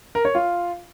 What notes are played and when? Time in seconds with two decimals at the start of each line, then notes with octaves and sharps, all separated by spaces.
0.15 A#4
0.25 C#5
0.35 F4